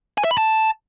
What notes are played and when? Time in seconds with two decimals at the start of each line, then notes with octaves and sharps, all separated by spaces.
0.18 G#5
0.24 E5
0.31 B5
0.38 A5